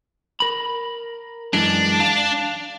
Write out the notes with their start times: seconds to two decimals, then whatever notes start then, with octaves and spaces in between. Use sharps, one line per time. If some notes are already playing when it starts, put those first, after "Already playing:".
0.40 A#4 B5
1.53 F#2 E3 G#3 D4
2.00 F5 A5